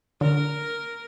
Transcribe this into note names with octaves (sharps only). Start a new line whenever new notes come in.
D3 A#4